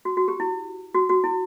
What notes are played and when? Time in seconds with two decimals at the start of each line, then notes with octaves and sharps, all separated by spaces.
0.05 F#4
0.17 F#4
0.28 G4
0.40 E4
0.95 F#4
1.09 F#4
1.24 E4